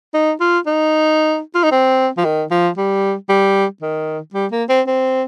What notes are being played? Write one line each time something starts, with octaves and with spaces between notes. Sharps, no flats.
D#4
F4
D#4
F4
D#4
C4
F3
D#3
F3
G3
G3
D#3
G3
A#3
C4
C4